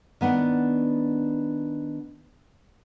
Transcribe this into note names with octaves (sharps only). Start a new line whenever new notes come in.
D#3 B3 D4 F#5